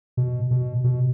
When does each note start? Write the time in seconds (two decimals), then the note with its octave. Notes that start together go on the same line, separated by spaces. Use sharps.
0.17 B2
0.51 B2
0.84 B2